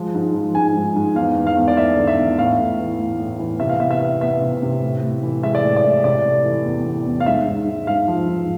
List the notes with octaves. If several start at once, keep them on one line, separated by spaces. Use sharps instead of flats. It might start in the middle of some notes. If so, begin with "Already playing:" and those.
Already playing: F3 G#3
G#2
F3
G#2 G#5
G#2
G#2
E2 F5
E2
F5
E2
D5
A3 E5
D3
E5
E2
A2 F5
A2
E3
A2
A2
E3
C3 E5
F5
B3 E5
E5
B3
B3 E5
C3
C3
A2
A2
E3
G#3 E5
D5
A2
D5
A2
C3 D5
A3
E3
E2
E2
E2
F5
G#2 E5
G#2
G#2
G#2 F5
F3
G#2